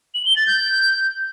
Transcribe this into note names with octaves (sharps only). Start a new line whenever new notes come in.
F#7
G7
A6
G6